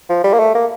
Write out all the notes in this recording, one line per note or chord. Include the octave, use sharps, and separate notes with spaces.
F3
G3
A#3
A3
A#3